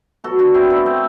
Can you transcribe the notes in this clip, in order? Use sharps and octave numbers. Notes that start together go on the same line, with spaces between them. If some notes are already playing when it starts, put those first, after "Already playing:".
B2 F#3 F#4 A4
D4 F#4
C4 E4
B3 D4
A3 C4